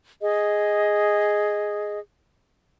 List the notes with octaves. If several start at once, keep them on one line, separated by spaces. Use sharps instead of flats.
G#4 D#5